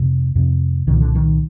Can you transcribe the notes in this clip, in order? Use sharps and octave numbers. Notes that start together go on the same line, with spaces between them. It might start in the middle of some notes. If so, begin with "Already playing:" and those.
Already playing: F2 C3
F2 C3
C2 A#2 D#3
D3
D#3